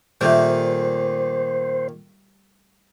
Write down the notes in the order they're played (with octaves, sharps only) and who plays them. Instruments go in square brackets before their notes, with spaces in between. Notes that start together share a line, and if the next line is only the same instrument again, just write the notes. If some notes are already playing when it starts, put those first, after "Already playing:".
[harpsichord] A#2 D#3 [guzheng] G3 A3 [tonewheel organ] C5